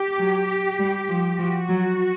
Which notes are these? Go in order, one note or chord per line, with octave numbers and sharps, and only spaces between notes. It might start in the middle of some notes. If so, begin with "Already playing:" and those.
Already playing: G4
F#3
G3
F3
F3 F#4
F#3